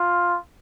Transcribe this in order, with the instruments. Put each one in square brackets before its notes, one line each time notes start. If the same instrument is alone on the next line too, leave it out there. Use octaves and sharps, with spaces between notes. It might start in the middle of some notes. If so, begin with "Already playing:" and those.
Already playing: [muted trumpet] F4